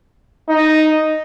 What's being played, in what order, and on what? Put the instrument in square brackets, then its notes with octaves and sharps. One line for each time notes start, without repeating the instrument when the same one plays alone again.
[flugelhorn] D#4